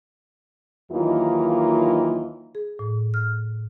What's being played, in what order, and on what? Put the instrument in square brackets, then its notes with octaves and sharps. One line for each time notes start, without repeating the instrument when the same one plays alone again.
[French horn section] D#2 E3 F#3 A#3 D#4 F4
[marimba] G#4
A2
F6